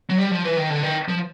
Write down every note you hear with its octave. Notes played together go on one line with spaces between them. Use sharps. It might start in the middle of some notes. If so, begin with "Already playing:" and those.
F#3
G3
F3
E3
D#3
D3
D#3
F3